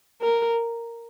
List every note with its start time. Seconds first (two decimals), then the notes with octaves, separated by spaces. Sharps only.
0.22 A#4